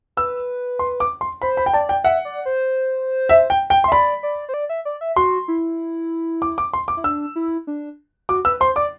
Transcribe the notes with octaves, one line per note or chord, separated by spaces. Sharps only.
B4 E6
C6
D6
C6
C5 B5
B5
G5
D5 A5
G5
E5 F#5
D5
C5
E5
G5
G5
C6
E5
D5 B5
D5
C5
D5
E5
D5
E5
F#4 C6
E4
D6
D6
C6
D6
E4
D4 E6
E4
D4
F#4 D6
B4 E6
C5 C6
D5 D6